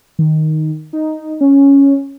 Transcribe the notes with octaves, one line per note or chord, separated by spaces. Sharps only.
D#3
D#4
C#4